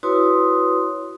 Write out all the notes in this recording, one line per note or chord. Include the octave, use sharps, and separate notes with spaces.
E4 F#4 B4 C#5 C6 D#6